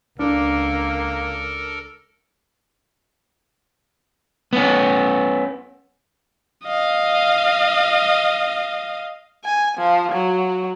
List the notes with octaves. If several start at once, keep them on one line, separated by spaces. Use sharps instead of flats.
C#2 A#3 D4 A4 A#4
B3 C#4
D#5 F5
G#5
F3
F#3